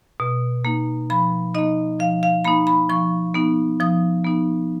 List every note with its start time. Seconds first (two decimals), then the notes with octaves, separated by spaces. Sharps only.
0.20 B2
0.65 A#3 D#4
1.10 F3 B5
1.54 A#3 D#4 D#5
1.99 F3 F5
2.23 F5
2.44 A#3 D#4 B5
2.67 B5
2.90 F3 C#6
3.34 B3 D#4
3.80 F3 D#6
4.24 B3 D#4